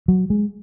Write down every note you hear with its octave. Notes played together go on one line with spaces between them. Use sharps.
F#3
G#3